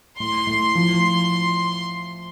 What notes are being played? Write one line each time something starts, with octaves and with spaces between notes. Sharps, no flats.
A2 C6
A2
F3